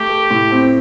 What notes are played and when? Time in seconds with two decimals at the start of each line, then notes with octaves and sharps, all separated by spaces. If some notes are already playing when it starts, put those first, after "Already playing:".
Already playing: A3 G4
0.09 A4
0.31 A2
0.51 C4